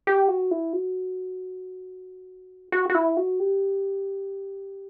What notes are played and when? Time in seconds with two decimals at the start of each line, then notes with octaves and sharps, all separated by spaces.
0.07 G4
0.28 F#4
0.51 E4
0.73 F#4
2.72 F#4
2.90 F#4
2.95 E4
3.17 F#4
3.39 G4